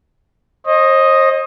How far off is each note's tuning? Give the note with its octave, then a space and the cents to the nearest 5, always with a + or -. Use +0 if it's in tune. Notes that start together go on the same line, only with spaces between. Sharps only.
C5 +40 D#5 +0